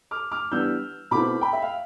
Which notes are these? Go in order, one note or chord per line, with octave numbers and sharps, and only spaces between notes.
D6 F6
D6 F6
E3 G3 B3 D4 E6 G6
B2 A3 C4 E4 B5 D6
G5 B5
E5
F5